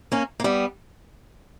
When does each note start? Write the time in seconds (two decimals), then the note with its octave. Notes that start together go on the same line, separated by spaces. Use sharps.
0.12 A#3 C#4
0.40 A#3
0.44 G3 B3